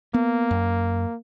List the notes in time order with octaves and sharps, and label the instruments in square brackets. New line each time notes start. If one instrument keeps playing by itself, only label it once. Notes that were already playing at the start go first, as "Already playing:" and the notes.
[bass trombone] A#3 [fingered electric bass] B3
[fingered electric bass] F#2